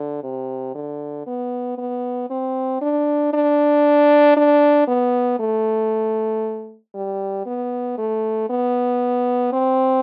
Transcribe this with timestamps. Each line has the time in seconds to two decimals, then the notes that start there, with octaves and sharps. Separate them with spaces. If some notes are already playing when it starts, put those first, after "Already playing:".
Already playing: D3
0.23 C3
0.75 D3
1.27 B3
1.78 B3
2.30 C4
2.81 D4
3.33 D4
4.36 D4
4.88 B3
5.39 A3
6.95 G3
7.46 B3
7.98 A3
8.50 B3
9.53 C4